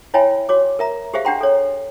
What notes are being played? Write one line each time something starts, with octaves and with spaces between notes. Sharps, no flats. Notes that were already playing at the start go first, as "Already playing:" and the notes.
E4 C#5 E5 G5 G#5 B5
F#4 C#5 D6
A#4 E5 A#5
G4 G#4 C5 E5 F5
D4 G4 F#5 G5 A#5 C6
A4 C#5